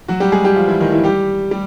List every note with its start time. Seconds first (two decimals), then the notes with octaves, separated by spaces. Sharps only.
0.08 F#3 F#4
0.20 G3 G4
0.32 G#3 G#4
0.44 G3 G4
0.56 F3 F4
0.68 E3 E4
0.80 D#3 D#4
0.92 E3 E4
1.04 G3 G4
1.51 G3